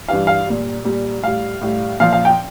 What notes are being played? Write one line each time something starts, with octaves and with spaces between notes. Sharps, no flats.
G2 E3 G3 F5
F5
A#2 G3
A#2 G3
A2 G3 F5
A2 G3
A#2 F3 F5
F5
G5